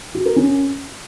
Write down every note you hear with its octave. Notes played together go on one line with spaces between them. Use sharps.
F#4
A#4
C#4